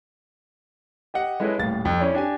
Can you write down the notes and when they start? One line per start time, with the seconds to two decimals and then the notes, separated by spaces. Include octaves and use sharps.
1.14 G4 D#5 F#5
1.40 G#3 E4 A4 B4 C#5 D#5
1.58 D#1 A2 F5 A6
1.85 F2
2.00 C#4 E4 D5
2.15 D4 G4 G#5